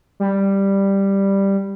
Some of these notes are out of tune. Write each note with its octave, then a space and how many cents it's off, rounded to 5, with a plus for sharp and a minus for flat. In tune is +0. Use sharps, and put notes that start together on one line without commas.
G3 +5